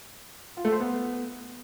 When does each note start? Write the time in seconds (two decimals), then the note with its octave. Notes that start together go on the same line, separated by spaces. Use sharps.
0.57 F4
0.65 A3
0.72 C5
0.80 B3